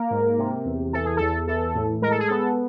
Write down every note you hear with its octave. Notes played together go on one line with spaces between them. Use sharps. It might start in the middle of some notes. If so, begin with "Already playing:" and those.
Already playing: A#3 A#4
G#2
C3
E2
E3 A4
G#4
E2 A4
E3 A4
A2
G#3 A#4
A4
G#4
B3 A4